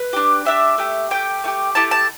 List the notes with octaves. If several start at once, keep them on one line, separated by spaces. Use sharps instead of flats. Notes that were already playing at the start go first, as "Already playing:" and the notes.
Already playing: B4
D4 G4
D4 G4 E5
A3 G4
A3 G4 G5
A3 E4 G4
A3 E4 G4 A5
A5